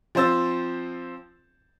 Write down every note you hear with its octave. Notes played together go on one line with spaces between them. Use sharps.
F3 C4 C5 E6 A6